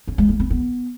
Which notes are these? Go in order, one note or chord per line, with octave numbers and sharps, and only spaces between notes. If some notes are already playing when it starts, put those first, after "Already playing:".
C#4
G#3
A#3
C4
B3